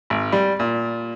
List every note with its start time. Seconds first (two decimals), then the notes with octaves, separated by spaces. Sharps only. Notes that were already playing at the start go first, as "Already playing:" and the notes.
0.10 G#1
0.32 G3
0.59 A#2